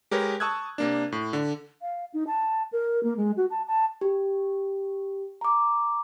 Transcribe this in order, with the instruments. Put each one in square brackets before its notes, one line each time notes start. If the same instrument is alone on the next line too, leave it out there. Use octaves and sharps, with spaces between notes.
[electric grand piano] G#3 G4 A#4 B4 C#5
A5 C#6 D#6 E6 F#6 G#6
C3 A#3 D4
A2
D3
[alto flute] F5
D#4
A5
A#4
A#3
G#3
F#4
A5
A5
[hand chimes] G4
A#5 D6